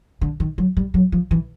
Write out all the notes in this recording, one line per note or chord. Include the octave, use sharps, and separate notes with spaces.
D3
D#3
F#3
G3
F#3
F3
E3